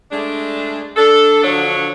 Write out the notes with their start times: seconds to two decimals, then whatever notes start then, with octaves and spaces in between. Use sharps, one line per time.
0.12 G#3 A3 D4
0.97 D4 A4
1.43 D3 F3 F#3 D4 C#5